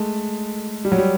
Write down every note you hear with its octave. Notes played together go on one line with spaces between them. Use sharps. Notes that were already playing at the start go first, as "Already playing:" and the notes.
Already playing: G#3 A3
G3
F#3
G3